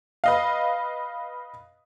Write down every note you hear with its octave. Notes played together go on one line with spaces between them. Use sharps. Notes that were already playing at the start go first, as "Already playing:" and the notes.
B4 D#5 F5